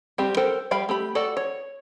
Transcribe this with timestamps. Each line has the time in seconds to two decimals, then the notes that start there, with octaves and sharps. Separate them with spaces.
0.18 G3 C4 G4
0.37 A4 A#4 C5 G5
0.71 G3 F5 G5 B5
0.89 A3 G4 B5
1.15 F#4 A4 D5
1.37 C#5